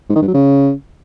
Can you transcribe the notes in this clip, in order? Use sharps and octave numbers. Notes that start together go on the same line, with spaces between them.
G#2
D#3
G2
F#3
C#3